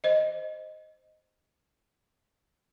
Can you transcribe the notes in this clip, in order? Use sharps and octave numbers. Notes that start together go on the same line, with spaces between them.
C5 D#5